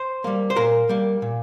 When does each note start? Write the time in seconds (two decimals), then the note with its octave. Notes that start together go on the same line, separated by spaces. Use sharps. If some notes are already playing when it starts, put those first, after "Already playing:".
Already playing: C5
0.24 G3 A#3
0.50 C5
0.56 A#2 A#4
0.89 G3 A#3
1.22 A#2